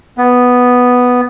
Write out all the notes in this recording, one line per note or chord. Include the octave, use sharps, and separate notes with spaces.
B3